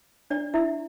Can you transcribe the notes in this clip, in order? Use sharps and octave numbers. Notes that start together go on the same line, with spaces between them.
D4 D5
E4 E5